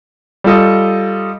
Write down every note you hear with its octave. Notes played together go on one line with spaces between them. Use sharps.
G3 F4 A4 D#5